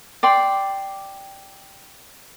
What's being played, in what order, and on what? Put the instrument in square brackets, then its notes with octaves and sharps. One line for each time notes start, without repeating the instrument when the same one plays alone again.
[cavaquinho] D5 G5 C6